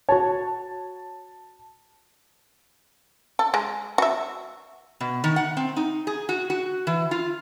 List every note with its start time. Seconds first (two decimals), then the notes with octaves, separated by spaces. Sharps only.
0.09 F#4 C#5 A5
3.39 A4
3.54 G#3
3.98 F#4 E5
5.01 B2
5.24 D#3
5.36 F#5
5.57 C4
5.76 D#4
6.07 G#4
6.29 F#4
6.50 F#4
6.87 E3
7.11 F4